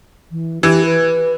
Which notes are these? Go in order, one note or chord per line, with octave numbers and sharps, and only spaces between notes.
E3
E3 G4
B4